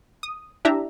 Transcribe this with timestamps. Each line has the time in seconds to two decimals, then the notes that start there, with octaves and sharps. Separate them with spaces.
0.23 D#6
0.65 D4 E4 G4 E5 A#5